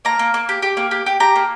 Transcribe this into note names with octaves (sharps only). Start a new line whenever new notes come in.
A#3 A#5
A#3
A#3
G4
G4
A#3
G4
G4
G4 A#5
A#3